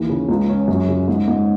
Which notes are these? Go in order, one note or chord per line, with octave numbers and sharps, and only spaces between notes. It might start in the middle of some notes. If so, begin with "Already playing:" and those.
Already playing: D#2 E3
C#3
C#2
C#4
F#2
C#3
G#2
G#2